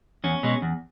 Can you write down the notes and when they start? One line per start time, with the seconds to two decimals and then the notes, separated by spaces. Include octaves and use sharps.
0.24 E2 C#4
0.43 B2 G#3
0.62 E2